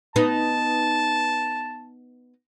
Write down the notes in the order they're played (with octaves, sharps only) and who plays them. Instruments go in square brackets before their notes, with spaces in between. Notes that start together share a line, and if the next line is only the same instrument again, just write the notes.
[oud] B3 D#4 [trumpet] A5